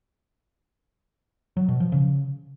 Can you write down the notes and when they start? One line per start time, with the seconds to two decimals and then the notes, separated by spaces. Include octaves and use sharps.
1.57 F#3
1.68 B2
1.80 F3
1.92 C#3